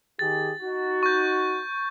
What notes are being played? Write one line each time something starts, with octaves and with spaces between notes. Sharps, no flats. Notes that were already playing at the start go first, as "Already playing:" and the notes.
D#3 G4 G#4 A6
D#4 F#4
C#6 G6